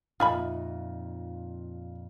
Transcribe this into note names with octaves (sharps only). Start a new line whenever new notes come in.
F2 A#2 D#4 F4 E5 B5